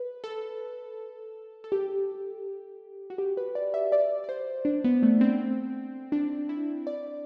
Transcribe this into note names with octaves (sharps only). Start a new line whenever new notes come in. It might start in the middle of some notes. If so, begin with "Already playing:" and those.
Already playing: B4
A4
A4
G4
F#4
G4
B4
D5
E5
D5
D5
C5
D4
B3
A3
C4
D4
E4
D5